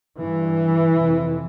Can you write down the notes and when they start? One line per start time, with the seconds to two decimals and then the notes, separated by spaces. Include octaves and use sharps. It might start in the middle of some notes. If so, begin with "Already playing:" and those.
0.20 G2 E3
0.94 F2 C3